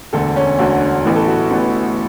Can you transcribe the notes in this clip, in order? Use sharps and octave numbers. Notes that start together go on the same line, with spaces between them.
E1 D2 D3 A4
C#4
E1 D2 D3 F#4
A1 A2 E3 B3
A4
F#4
A1 A2 E3 B3